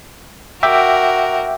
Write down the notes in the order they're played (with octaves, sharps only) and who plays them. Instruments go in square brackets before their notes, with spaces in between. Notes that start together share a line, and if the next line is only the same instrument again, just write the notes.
[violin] F#4 A#4 [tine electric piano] E5 G5 D6